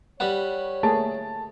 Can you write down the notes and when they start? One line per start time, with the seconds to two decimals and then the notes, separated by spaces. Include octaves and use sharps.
0.20 G3 B4 C#5 F#5
0.83 A3 A#3 G#4 A5